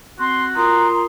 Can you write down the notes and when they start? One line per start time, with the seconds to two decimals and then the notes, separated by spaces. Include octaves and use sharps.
0.19 C4 F#4 C6
0.55 F4 A#4 A#5 C6 D#6